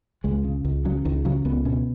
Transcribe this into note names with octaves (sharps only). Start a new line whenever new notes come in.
C#2 G#3
C#3
C#2
C#3 F#3
C#2 D#3
C#3 F#3
C#2 B3
B2 C#4